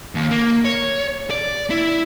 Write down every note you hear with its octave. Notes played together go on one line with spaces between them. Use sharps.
D#2
A#3
C#5
D5
E4